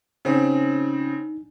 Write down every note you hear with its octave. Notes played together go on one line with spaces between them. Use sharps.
C#3 C4 D4 D#4